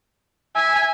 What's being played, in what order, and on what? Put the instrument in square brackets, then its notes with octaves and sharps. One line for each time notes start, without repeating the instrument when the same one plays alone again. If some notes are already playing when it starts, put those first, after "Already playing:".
[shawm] E5 [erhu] G#5